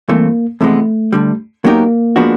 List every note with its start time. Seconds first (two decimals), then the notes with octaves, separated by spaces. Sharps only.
0.08 G2 E3 A3 A#3 C4
0.61 F2 C3 E3 G#3 A3 B3
1.13 D2 D3 G3
1.64 F#3 A#3 B3 D#4 G4 A#4
2.16 F3 G#3 B3 D4 F#4